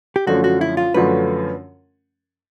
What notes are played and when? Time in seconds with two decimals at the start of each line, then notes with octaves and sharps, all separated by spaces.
0.16 G4
0.27 F#2 D3 F3 A3 C#4 F#4
0.44 F#4
0.61 E4
0.77 F4
0.94 F#2 D3 F3 A3 C#4 B4